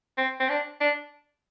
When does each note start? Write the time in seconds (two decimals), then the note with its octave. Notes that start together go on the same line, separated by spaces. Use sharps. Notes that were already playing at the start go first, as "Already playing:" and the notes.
0.18 C4
0.40 C4
0.49 D4
0.80 D4